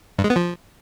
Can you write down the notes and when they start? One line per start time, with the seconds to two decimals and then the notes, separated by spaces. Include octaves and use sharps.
0.19 G2
0.24 G#3
0.30 B3
0.36 F3